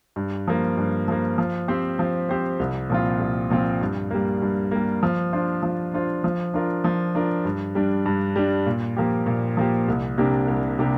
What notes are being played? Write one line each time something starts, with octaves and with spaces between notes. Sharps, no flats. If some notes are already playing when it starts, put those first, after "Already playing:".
G2
F3 A#3
G2
F3 A#3
F3
C4 G4 C5
F3
C4 G4 C5
C2
A#2 F3 C4 F4
C2
A#2 F3 C4 F4
G2
G3 A#3
G2
G3 A#3
F3
D4 F4 C5
F3
D4 F4 C5
F3
D4 F4 A#4
F3
D4 F4 A#4
G2
G3 D4
G2
G3 D4
A#2
F3 A#3 G4
A#2
F3 A#3 G4
C2
C3 A#3 D4 G4
C2
C3 A#3 D4 G4